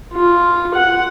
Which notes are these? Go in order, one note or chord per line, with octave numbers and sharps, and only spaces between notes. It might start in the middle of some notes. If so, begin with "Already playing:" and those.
F4
F#5